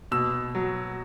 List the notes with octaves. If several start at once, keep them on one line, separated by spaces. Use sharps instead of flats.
B2 E6
F#3